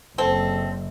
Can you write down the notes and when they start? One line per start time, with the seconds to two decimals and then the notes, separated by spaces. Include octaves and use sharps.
0.18 F#1 C4 A4